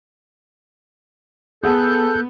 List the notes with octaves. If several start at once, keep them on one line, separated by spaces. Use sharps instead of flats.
B3 G#4 A4 F#5 A5 F#6 G6